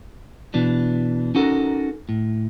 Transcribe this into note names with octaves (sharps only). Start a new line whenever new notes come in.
B2 E3 D4
C#4 D#4 F#4 A4 A#4
A2